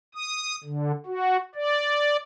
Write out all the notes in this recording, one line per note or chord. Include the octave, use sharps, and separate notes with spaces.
D#6
D3
F#4
D5